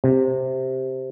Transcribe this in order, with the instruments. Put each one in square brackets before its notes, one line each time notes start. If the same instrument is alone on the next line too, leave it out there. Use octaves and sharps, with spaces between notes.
[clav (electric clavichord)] C3